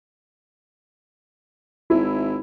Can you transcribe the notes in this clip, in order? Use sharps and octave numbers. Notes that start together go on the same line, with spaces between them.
G#1 E4